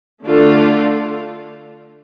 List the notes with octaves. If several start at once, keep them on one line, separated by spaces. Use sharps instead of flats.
D3 A3 D4 F4 A4